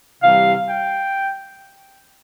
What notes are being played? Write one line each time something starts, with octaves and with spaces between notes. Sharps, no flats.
C3 E3 G3 F5
G5